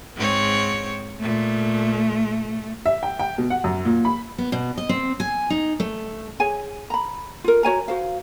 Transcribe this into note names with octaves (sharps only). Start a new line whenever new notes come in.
G#2 C4 C#5
A#2 A3
E5
G5
G5
B2
F#5
F#2
A#2
B5
B3
B2
D#5
C4
G#5
D#4
A3
G#4 C#5 G#5
A#5 B5
F4 A#4
F#4 C#5 G#5 A#5
F#4 C5 F5